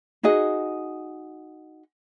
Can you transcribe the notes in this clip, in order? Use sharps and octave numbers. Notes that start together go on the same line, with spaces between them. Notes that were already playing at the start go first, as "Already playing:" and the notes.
D#4 F#4 G#4 D#5